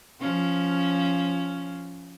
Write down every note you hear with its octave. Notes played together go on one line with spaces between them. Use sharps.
F3 C#4